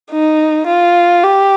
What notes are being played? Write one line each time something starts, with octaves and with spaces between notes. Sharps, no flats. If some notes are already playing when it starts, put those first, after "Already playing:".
D#4
F4
G4